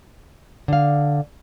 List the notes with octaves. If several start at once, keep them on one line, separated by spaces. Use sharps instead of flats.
D3 F5